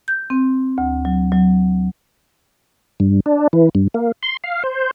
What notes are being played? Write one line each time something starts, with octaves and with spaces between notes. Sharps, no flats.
G6
C4
D2
F#3
F#3
G2
D4
E3
G2
A#3
C6
F5
C5